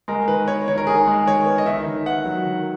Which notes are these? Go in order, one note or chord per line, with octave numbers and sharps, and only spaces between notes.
G#3 A#4
D#3 B4
B3 C#5
D#3 C#5
A#4
D#3 G#4
G#3
D#3 C#5
B3
D#5
D#3 E5
D#3
B3 F#5
F#3
D#3